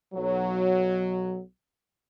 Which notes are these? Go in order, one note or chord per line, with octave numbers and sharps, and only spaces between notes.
B1 F#3